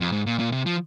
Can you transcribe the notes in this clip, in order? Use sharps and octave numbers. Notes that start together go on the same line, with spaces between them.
F2
G#2
A#2
A#2
C3
F3